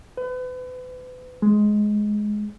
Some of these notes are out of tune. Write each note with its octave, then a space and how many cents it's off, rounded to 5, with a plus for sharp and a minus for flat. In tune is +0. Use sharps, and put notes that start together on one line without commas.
B4 +35
G#3 +10